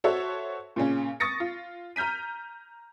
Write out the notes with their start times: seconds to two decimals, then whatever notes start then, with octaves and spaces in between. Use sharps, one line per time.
0.04 F#4 A4 C5 C#5 E5
0.76 A#2 C#3 C#4
1.20 C#6 D#6 A6 A#6 C#7
1.40 F4
1.96 A#5 F6 G6 B6 D#7